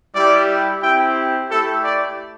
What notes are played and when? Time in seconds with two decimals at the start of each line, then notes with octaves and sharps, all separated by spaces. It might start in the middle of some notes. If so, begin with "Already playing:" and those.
0.14 G3 E4 G4 D5
0.82 C4 E4 G4 G5
1.49 A3 E4 G4 A4
1.83 D5